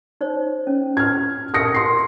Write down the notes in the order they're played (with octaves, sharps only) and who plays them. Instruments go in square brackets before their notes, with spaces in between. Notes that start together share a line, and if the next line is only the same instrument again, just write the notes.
[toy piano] D#4 C5 C#5
C#4
[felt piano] F6 G#6
[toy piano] G4 A#4 E5 [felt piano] D#6 A#6 C#7
[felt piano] C6 C7